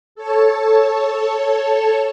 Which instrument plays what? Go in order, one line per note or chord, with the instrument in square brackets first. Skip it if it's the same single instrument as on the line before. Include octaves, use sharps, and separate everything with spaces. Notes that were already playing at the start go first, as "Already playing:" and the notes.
[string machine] A4 C#5 A5